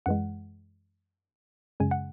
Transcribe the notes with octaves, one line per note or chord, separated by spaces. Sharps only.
F#2 E3 G#3 F#5
F#2 C#3 G#3 G#5
F#5